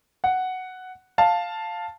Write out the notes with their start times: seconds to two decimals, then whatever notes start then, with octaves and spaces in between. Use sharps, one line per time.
0.24 F#5
1.18 F5 A5